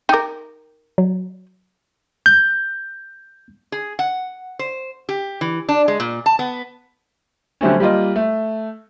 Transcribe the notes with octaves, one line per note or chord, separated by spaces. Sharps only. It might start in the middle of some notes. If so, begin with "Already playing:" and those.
D#4 A#4 G5 D6
F#3
G6
G#4
F#5
C5
G4
E3
D4
G#3
A#2
A5
B3
D3 F#3 G3 A3 C4 C#4
G3 A#3 F4 D#5
A3